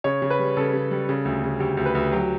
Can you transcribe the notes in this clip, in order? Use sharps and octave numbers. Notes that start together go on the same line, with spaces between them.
C#3 C#5
C#3
B4
G3
C#3 A4
C#3
G3
C#3
D2
C#3
D2 G4
D2
B4
D2
F#3 G4